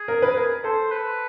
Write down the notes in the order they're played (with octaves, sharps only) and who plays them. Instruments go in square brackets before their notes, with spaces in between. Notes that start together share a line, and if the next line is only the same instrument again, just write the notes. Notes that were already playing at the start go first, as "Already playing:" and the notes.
Already playing: [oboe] G#4
[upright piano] A#4
B4
A#4
[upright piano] A4 [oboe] C5
[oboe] B4